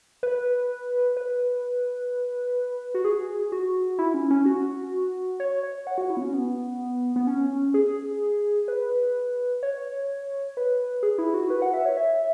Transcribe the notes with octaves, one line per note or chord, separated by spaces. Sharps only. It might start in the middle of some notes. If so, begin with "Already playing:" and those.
B4
B4
F#4
G#4
F#4
E4
C#4
C#4
F#4
C#5
C#5
F#5
F#4
E4
B3
C#4
B3
B3
C#4
G#4
B4
C#5
B4
G#4
E4
F#4
B4
F#5
E5
C#5
E5